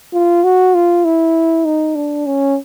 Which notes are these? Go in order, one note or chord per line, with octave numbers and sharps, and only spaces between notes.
F4
F#4
F4
E4
D#4
D4
C#4